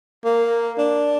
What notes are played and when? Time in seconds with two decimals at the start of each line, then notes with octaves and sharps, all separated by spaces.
0.25 A#3
0.78 D4